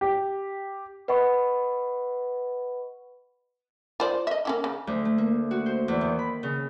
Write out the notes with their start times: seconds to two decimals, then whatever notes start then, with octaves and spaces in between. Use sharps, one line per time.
0.01 G4
1.08 B4 D#5 F#5 B5 C#6
4.00 F4 C5 D5
4.27 D#5 E5
4.45 A#3 C#4 E4
4.64 C#3
4.87 D2
5.05 A3
5.18 A#3
5.51 F#4
5.66 C5
5.88 E2
6.01 D#3
6.19 B5
6.43 C#3